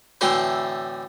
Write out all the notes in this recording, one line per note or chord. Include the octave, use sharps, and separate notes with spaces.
A2 D3 E3 C4 F#4 C6